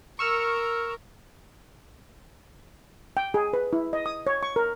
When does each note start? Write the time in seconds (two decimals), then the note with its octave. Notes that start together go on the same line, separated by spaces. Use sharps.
0.19 A#4 C#6 E6 F6
3.17 G5
3.34 G#4
3.53 B4
3.73 E4
3.93 D#5
4.06 D#6
4.27 C#5
4.43 C#6
4.56 A#4